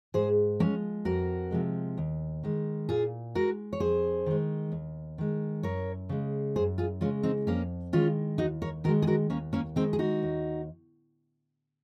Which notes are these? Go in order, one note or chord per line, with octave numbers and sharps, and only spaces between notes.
G#2 G#4 C5
F3 G#3 A#3 C#4
F2 F#4 A#4
C3 F3 G#3
D#2
D#3 G#3
A#2 F4 G#4
G#3 F#4 A#4
C#5
F2 G#4 C5
D#3 G#3
D#2
D#3 G#3
F#2 A#4 C#5
C#3 G#3
F#2 G#4 C5
F4 G#4
C#3 G#3 C#4 F4
C4 D#4
F2 A#3 C#4
D#3 G#3 C#4 F4
D#2 D#4 F#4
A#4 C#5
D#3 G#3 F#4 A#4
G#4
F#4 A#4
D#2 A#3 C#4
A#3 C#4
D#3 G#3 C4 D#4
G#4
D#4 F#4
D#2